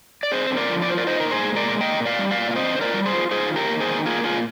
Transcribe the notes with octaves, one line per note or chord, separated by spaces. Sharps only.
D5
C4 G#4 C5
D3
A#4 D5
F3
D5
F4 C5
A#4 D5
D#4 C5 D#5
A#4
A#2
G#4 C5
G#3
A#4 D5
A#2
A#3 D#5 G5
A#2
D5 F5
G3
D5 F5
A#2
F5
C4 C5 D#5
D3 C5
A#4 D5
G3
G#4 C5
F4
F4 G#4 C5
D#3
G4 A#4
A#3
G#4 C5
D#3
A#3 F4 G#4
A#2 F4 G#4